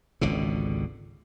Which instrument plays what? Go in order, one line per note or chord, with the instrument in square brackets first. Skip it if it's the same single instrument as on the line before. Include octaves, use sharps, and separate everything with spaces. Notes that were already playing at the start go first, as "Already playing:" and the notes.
[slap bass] G#1 C#2 B2 D3